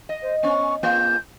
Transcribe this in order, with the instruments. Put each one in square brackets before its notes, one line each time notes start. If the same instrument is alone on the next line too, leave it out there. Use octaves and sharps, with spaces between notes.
[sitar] D#5
[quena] C5
[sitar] B3 C#4 [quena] C#6
[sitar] A#3 F4 G#4 [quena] G6